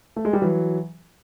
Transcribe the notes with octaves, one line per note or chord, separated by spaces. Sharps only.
A3
G#3
G3
E3 F#3